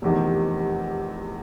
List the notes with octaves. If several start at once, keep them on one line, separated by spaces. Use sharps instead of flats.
F1 E2 C3 D#3